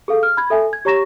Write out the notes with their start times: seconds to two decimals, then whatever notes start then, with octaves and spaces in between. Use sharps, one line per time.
0.08 G#4 A4 F5
0.23 F6
0.37 B5 G#6
0.50 A4 E5 G#5
0.73 G#6
0.85 G4 C#5 A#5 C#6 A#6 E7